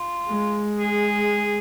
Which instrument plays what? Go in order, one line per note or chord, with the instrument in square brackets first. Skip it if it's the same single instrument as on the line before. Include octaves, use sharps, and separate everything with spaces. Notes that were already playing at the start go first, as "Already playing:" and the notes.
Already playing: [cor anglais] F4
[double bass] G#3
[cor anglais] G#4